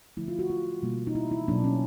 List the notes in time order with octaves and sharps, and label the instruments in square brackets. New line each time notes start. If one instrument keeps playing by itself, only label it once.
[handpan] D3 F3 A3 E4
F4
F#4
F4
B2 G3 A#3
D#4
E4
E4
B2 F#3 A#3 D4
C#4